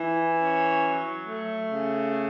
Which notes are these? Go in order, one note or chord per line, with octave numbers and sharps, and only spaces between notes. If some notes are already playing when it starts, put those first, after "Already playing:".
Already playing: E3
C#4
F#3
A3
C#3